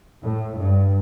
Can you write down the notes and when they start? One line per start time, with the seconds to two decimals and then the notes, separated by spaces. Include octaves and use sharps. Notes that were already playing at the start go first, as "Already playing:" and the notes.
0.23 A2
0.58 G2